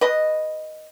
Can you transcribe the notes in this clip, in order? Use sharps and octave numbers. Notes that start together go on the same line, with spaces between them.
B4 D#5